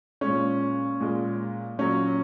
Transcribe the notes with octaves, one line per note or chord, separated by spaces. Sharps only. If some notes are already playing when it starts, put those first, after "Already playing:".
G#3 C#4
A#2
A#2 G#3
A#2 F#3 C#4